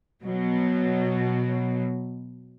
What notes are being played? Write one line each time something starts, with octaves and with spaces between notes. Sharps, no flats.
B2 F#3